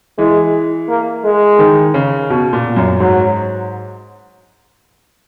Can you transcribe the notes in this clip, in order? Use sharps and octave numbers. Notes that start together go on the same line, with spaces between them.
E3 G#3
A#3
G#3
D#3
C#3
B2
A#2
F#2
G#2 F#3